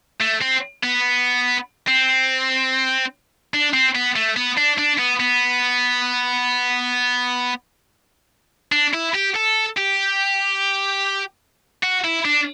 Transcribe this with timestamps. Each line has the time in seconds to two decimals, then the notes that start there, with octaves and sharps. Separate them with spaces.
0.21 A3
0.42 C4
0.84 B3
1.87 C4
3.54 D4
3.74 C4
3.95 B3
4.16 A3
4.36 B3
4.57 D4
4.78 D4
4.98 B3
5.20 B3
8.72 D4
8.93 E4
9.14 G4
9.35 A4
9.77 G4
11.83 F#4
12.04 E4
12.25 D4